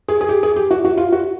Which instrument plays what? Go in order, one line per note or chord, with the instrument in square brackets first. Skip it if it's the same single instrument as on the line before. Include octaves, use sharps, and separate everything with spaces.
[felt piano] G#4
G#4
G4
G#4
G4
F#4
F#4
F4
F#4